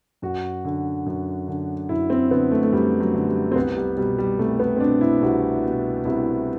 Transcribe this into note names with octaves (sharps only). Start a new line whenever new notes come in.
F#2 F#4
D3
F#2
D3
F#2 E4
C4
D3 B3
A3
A3
F#2 G3
F#3
D3
G3
C4
C2 B3
G3
B2 G3
G3
C2 A3
B3
C4
B2 D4
E4
C2 F#4
B2
C2 E4